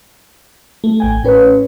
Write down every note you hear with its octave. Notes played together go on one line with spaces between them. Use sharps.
A3
A1 G5 G#5
A2 C#4 B4 C#5